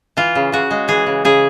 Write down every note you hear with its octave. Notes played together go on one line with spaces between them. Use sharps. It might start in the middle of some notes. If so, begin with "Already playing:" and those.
E3 F4
C#3
C#3 F#4
G#3
E3 G#4
C#3
C#3 G#4